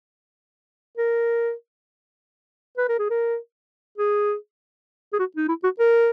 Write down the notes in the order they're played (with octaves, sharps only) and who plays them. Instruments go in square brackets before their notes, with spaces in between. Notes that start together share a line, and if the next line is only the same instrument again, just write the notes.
[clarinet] A#4
B4
A#4
G#4
A#4
G#4
G#4
F#4
D#4
E4
F#4
A#4